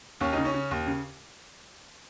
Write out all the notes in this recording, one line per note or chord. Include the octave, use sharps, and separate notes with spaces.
D#2 C#4
C#3 D#4
C#4
C#3
D#2
C#3